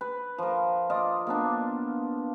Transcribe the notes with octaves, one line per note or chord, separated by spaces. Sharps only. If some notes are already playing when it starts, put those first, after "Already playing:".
B4
F3 A#4
F4 D5 D#5
A#3 B3 D4